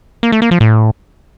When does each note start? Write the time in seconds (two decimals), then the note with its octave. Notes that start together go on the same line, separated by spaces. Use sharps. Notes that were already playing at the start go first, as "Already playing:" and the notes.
0.23 A#3
0.32 A3
0.42 A#3
0.51 F3
0.61 A2